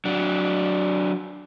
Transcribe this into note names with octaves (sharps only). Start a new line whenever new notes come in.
F#3 D4